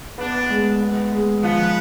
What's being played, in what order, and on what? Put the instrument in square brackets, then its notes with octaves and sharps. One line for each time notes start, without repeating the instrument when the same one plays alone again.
[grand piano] B3 [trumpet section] D4
[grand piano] G#3
B3
G#3
[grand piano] F3 [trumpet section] B3